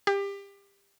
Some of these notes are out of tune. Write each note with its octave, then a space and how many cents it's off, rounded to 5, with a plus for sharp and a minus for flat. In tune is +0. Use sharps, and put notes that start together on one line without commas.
G4 +25